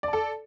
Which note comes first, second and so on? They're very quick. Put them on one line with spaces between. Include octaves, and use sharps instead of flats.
D5 A5 A4